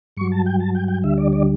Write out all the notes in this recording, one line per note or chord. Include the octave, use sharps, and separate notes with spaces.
G2 F#3 C#6
A5
G5
A5
G5
G5
D2 D3 G3 E5
D5
D5